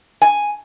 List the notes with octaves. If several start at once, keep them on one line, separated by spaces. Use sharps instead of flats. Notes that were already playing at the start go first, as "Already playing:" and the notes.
G#5